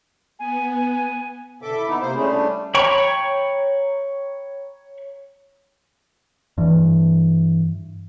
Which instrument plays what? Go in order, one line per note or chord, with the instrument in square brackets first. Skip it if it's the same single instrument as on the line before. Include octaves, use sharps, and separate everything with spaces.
[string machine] B3 [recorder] G#5
[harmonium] G2 B2 D3 [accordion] A4 E5 D6
[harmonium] E4
[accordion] B3 D#4
[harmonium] C3 [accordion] A#3 C5
[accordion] G3 A3 [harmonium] C#4 E4 G#4
[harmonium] D4
[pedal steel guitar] C#5 G5 A#5 B5 C#6
[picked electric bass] G2 E3